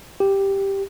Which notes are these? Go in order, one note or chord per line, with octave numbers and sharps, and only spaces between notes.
G4